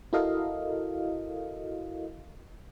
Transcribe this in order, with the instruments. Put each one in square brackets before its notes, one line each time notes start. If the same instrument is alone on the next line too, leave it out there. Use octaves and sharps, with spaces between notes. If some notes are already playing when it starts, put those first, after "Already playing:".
[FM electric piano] E4 F#4 A4 A#4 D#5 F5